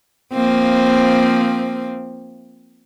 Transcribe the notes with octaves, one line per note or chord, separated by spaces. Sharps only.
F3 A#3 C4